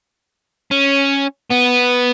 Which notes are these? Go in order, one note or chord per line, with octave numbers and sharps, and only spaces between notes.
C#4
B3